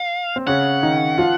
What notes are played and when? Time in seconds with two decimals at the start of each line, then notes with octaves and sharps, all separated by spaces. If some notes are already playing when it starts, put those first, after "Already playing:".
Already playing: F5
0.36 C4
0.47 C#3 C#4 F#5
0.83 D#3 D#4
1.18 F3 F4